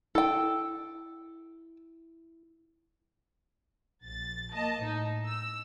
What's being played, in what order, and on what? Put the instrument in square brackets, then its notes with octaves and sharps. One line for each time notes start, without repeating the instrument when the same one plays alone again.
[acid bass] E4 [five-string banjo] A4 G5
[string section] A#1 A6
A#3 D#5 A5
A2 D#4
E6